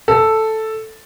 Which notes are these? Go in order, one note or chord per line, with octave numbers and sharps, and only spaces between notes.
A4